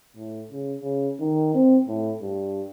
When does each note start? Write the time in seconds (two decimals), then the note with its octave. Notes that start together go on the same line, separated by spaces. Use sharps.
0.17 A2
0.51 C#3
0.80 C#3
1.20 D#3
1.55 C4
1.88 A2
2.22 G2